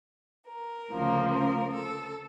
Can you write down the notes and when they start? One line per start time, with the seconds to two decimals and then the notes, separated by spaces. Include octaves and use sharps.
0.48 A#4
0.90 D2 C#3 F3 A#3
1.31 A#4
1.74 A4